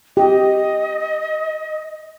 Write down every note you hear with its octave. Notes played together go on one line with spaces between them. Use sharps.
G4 D#5